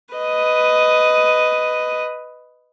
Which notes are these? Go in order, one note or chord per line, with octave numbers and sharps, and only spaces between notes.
B4 D#5